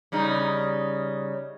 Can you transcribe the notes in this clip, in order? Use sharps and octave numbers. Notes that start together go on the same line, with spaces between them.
C#3 G3 D#4